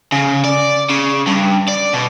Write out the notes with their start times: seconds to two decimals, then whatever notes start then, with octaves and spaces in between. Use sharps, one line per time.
0.12 C#3
0.44 D5
0.90 C#3
1.27 G2
1.68 D5
1.93 B2